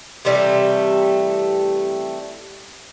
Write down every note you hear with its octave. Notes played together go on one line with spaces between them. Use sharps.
C3 E3 G3 A3